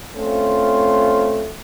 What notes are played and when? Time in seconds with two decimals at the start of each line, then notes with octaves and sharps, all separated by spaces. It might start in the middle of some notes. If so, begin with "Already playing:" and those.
0.16 A3 C4 C#4 F4